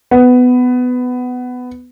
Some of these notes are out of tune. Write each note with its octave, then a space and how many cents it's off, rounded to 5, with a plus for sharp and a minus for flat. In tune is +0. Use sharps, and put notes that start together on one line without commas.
B3 +15